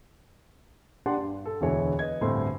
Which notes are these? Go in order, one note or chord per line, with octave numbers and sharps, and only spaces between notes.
D4 G4 D5 F#5 A5 C6
G2
A4
E1 D2 B2 E3 C#5
B4 D#5 G#6
G1 D2 A2 C4 C6